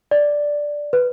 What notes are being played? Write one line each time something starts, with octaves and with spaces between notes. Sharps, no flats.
D5
B4